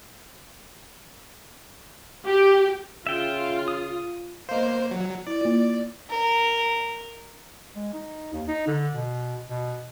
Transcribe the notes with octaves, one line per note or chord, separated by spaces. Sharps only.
G4
C#3 F4 E5 G5
D#6
A#3 C5 D#5 F5
F#3
E4 D5
A#3 F4
A#4
G#3
D#4
D#2
D#4
D3
B2
B2